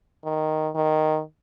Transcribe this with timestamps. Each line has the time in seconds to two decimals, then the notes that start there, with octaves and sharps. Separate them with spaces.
0.24 D#3
0.75 D#3